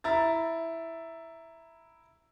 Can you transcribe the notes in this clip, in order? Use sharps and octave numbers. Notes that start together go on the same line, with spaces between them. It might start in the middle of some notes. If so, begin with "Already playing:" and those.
E4 A#5 A6